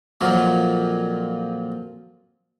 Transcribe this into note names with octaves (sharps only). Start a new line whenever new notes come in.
F2 A#2 F3 F#3